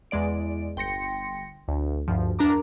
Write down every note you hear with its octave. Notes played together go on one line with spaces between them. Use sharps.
E2 G#3 D5 D7
G1 G5 C6 A#6 C#7
D2
D2 G2 F3
E2 D4 A#4 A#5 D6